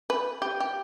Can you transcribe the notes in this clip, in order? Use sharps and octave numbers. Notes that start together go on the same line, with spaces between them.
B4
G4
G4